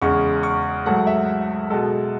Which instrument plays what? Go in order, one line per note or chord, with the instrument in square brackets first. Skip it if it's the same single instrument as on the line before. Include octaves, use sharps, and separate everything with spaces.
[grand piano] E2 C#3 G#3 C#6
C#6
G#2 F#3 A3 F#5
E5
B2 G#3 A4